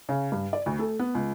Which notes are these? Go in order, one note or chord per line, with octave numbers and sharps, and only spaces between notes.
C#3
G2
D5
D2
A3
B3
C#2